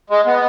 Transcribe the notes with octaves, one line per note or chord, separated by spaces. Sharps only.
G#3
B3